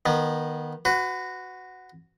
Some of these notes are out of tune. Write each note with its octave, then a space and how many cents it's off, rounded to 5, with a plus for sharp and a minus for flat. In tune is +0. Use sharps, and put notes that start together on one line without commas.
D#3 -15 B3 -30
F#4 +0 B4 +30